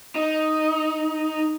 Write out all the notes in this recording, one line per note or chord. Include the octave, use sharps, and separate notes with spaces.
D#4